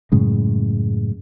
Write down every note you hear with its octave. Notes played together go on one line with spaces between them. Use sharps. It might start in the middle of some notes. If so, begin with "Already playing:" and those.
F#2 A2 C#3 G#3